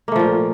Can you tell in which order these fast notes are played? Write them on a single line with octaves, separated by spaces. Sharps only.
A#3 A3 F3 A#2